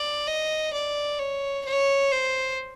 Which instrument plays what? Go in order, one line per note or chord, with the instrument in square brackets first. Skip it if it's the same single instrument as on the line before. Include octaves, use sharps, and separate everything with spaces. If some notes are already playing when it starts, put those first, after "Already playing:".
Already playing: [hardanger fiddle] D5
D#5
D5
C#5
C#5
C5